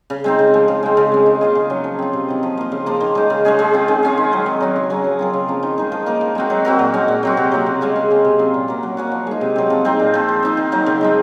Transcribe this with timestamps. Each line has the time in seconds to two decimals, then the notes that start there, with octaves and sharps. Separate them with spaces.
0.10 C#3
0.24 G#3 C4 D#4
0.39 C#3
0.54 F3 G#3
0.68 C#3
0.83 G#3 C4
0.97 C#3
1.12 G#3 C#4
1.26 D#3
1.41 A#3 F4 G#4
1.55 C#3
1.70 F#3 C#4
1.84 F3
1.99 C4 F4
2.13 C3
2.28 D#3 F#3
2.43 F3
2.57 A#3 F4
2.72 C#3
2.86 F3 A#3
3.01 D#3
3.15 G#3 D#4
3.30 C#3
3.45 G#3 C#4 G#4
3.59 G#3
3.74 C4 F4
3.88 D#3
4.03 G#3 C#4 F4
4.18 D#3
4.32 F#3 C4
4.46 D#3
4.60 F#3 C#4 F#4
4.76 C#3
4.90 F#3 C#4
5.04 F3
5.19 C4 F4 A#4
5.34 C#3
5.48 F3 A#3 C#4
5.63 D#3
5.78 G#3 D#4
5.92 F3
6.06 A#3 D#4 A#4
6.21 D#3
6.35 G#3 C4 F#4
6.50 F#3
6.65 C4 F#4 A#4
6.79 A#2
6.94 G#3 C#4
7.08 A#2
7.23 F#3 C4 F#4
7.37 C3
7.52 F#3 A#3 F4
7.66 C#3
7.81 G#3 C#4 F4
7.96 C#3
8.10 G#3 C4
8.25 C3
8.39 F#3 C#4 F4
8.54 A#2
8.68 F#3 A#3
8.83 F#3
8.97 A#3 C#4 F#4
9.12 F3
9.27 G#3 D#4
9.41 C3
9.56 F#3 C4
9.70 F3
9.85 G#3 C4 D#4
9.99 A#2
10.14 F3 C4
10.28 F3
10.43 C4 D#4
10.57 D#3
10.72 F#3 A#3 D#4
10.86 C#3
11.01 F3 G#3 C4